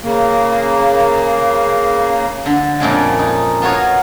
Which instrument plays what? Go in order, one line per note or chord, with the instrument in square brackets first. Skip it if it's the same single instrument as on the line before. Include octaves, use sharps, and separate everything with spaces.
[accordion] C#3 A#3
[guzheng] D3
F2 A#2 C#3 G#3
D#4
B3 F4 F#4 C#5 A#5